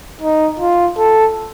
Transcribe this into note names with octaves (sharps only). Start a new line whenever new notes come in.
D#4
F4
A4